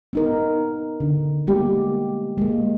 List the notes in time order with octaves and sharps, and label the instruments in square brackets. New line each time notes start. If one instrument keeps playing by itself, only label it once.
[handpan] B3 D#4 A#4
D3
G3 G#3 A#3 B3 G4
G#3 A#3